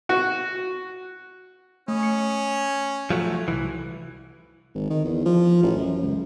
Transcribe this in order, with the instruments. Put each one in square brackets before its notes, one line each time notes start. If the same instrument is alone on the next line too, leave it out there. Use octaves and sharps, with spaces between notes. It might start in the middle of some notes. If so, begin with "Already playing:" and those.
[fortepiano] F#4
[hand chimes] A3 D#6 [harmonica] C#4
[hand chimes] C#7
[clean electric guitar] F3 F#3 A3
C2 E3
[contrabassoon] G#1
D#3
E2
F3
A1
F#2
C#2